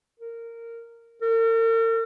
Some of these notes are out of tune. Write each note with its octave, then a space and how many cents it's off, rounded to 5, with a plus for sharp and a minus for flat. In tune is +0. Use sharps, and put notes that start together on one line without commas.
A#4 -15
A#4 -45